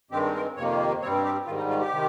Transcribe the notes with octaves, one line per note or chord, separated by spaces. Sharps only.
G2 D#3 G#3 C4 G4
A#4
F2 C3 D#3 A#3 C#5
G2 G3 C4 C#5
G4
G#2 D#3 G3 F4
D#4
F4
G4
C3 D#3